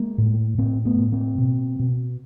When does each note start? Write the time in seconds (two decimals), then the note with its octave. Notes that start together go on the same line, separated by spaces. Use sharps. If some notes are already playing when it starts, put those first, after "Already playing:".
Already playing: G#3 A#3
0.18 A2
0.58 A2 A#3 C4
0.85 A3 B3
0.98 A2
1.12 A#3 C4
1.38 B2
1.79 B2